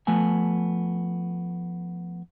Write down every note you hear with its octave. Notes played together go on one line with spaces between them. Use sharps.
F3 A3 B3 G#5